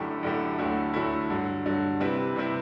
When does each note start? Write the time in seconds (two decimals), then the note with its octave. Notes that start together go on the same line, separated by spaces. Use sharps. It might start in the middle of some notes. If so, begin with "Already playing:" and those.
Already playing: F#2 D3 A3 E4 G4
0.23 F#2 D3 A3 E4 G4
0.58 D2 D3 F#3 A3 E4
0.94 D2 D3 F#3 A3 E4
1.30 G2 D3 F#3
1.66 G2 D3 F#3
2.00 C3 G3 C4 E4 B4
2.36 C3 G3 C4 E4 B4